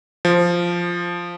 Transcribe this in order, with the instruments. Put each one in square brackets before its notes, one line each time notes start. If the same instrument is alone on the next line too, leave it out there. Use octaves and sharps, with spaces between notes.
[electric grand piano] F3